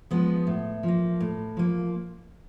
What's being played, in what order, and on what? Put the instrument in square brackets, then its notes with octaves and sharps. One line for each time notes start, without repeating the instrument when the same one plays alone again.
[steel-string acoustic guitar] F3 G#3 B3
A2
F3 A#3
A2
F3 A#3